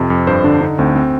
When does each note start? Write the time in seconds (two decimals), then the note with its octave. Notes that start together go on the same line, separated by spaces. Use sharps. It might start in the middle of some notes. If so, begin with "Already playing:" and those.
Already playing: F2 C3
0.10 F2
0.27 G2 C5
0.44 D3 D4
0.61 D3 D#4
0.78 D2 C4
0.96 C4